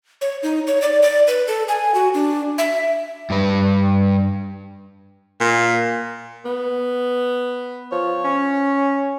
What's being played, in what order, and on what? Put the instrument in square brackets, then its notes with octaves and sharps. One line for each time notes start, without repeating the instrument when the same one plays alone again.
[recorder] C#5
D#4
C#5
D5
D5
B4
A4
G#5
F#4
D4
E5
[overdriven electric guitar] G2 B4
[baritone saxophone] A#2
[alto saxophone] B3
[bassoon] F3 [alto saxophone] C#5
[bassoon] C#4